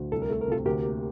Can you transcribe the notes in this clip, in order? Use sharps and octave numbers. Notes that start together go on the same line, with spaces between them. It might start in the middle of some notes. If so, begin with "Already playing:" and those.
Already playing: D2
C2 A4
A#4
A3 A4
A#4
C3 F4 A4
D2 G4 A#4
A#3